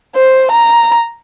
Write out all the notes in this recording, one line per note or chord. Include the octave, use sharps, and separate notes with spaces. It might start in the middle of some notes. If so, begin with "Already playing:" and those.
C5
A#5